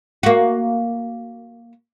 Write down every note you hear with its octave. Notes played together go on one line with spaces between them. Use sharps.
A#3 F#4